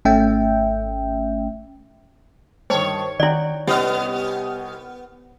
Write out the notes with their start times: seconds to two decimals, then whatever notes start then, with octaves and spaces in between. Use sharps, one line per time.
0.05 G#1 A3 C#4 E5 G5
2.70 G2 D#3 C5 C#5 A5
3.20 D#3 E4 D5 F#5 G5
3.67 C2 B3 C#4 D#4 G4 D#6 F6